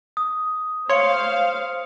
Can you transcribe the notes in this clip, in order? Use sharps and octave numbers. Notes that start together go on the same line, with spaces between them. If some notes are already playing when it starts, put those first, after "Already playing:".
D#6
C5 C#5 F5 C6 C#7